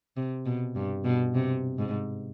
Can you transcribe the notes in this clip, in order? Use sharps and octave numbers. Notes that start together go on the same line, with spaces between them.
C3
B2
G2
B2
C3
G#2